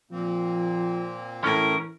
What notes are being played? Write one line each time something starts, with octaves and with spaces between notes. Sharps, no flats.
A#2 F3 A#3 C4
A2 E3 C#4 A#4